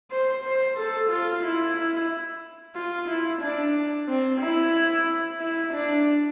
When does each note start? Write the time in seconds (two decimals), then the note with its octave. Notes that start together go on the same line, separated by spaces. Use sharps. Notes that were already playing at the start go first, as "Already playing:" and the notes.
0.12 C5
0.44 C5
0.78 A4
1.10 F4
1.44 E4
1.77 E4
2.75 F4
3.09 E4
3.42 D4
4.09 C4
4.41 E4
5.41 E4
5.74 D4